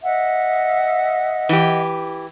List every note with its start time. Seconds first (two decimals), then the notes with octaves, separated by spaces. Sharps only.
0.02 D#5 E5 F#5
1.49 E3 G4